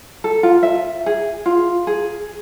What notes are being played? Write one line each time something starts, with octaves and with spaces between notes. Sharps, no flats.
A4
F4
E5
G#4
F4
G#4